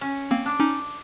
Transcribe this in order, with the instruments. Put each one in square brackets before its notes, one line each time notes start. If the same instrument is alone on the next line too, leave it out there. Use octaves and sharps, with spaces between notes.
[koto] C#4
[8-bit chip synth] A#3 C4
[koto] D4
[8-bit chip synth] C#4 D#4